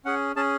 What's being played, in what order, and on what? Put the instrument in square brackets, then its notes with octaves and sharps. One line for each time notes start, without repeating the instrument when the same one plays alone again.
[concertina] C#4 G#4 F#5
C#4 G#4 A5